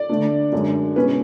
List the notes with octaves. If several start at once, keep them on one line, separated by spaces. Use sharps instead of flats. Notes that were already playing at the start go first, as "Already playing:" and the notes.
Already playing: D5
D3 A3 D4
F#2 D3 G#3 D4
B2 G#3 C#4 E4 B4